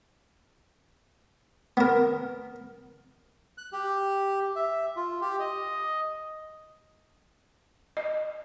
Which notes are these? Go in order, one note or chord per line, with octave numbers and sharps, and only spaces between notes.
B3 A#4
F#6
G4
E5
F4
G4
D#5
D#5